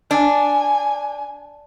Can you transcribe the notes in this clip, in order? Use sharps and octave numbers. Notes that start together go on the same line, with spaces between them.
D4 G#5